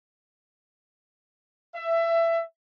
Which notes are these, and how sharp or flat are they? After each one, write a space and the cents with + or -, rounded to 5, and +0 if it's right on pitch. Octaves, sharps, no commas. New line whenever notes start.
E5 +20